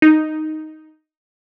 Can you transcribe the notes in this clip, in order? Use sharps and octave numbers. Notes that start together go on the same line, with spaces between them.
D#4